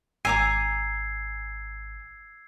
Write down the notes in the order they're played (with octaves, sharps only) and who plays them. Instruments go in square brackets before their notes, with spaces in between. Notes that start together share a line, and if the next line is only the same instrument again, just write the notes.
[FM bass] G#1 [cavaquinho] G#5 A#5 D6 [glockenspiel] E6 G#6 C7